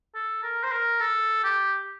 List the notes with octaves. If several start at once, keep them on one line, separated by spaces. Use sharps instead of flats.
A4
A#4
C5
A#4
A4
G4